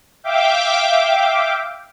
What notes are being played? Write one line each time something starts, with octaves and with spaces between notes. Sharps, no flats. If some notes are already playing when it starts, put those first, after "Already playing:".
E5 F5 G5 D6